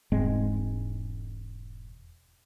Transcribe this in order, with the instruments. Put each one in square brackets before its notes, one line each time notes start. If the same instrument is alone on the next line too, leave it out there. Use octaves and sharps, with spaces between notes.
[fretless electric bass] E1 G#2 G#3 C4